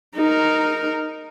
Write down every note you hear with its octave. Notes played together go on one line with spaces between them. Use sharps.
D#4 A#4